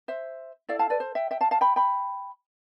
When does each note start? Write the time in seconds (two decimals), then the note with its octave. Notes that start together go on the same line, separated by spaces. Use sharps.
0.08 C5 E5
0.69 E4 A4 D5 F5
0.79 F5 A5
0.90 B4 D5
1.00 C5
1.15 E5 G5
1.31 E5 G5
1.41 F5 A5
1.51 F5 A5
1.61 G5 B5
1.76 G5 B5